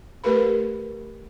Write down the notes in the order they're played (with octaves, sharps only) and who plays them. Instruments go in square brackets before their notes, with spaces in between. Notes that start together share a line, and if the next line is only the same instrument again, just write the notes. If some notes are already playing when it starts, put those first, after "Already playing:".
[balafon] A3 G4 A#4 B4 B5